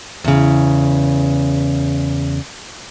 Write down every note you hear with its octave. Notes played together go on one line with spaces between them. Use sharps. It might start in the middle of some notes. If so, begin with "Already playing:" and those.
E2 C#3